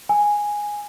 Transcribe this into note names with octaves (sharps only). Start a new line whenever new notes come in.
G#5